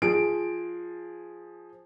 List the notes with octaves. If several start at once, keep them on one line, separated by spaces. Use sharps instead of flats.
F3 G#4 D7